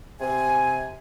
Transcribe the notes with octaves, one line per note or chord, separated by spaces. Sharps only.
C3 G#5